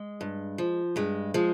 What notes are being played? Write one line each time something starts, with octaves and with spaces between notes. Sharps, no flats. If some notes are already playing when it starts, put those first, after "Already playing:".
Already playing: G#3
G2
F3
G2 G#3
F3 G#3